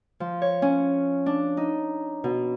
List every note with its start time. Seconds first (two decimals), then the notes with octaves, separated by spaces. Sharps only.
0.20 F3
0.42 C#5
0.62 C#4
1.26 D4
1.57 D#4
2.24 B2